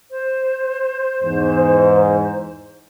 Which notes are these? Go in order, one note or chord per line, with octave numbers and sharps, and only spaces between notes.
C5
E2 G#2